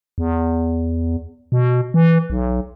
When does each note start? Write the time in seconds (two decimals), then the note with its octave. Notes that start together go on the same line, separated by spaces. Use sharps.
0.18 E2
1.52 B2
1.94 E3
2.30 B1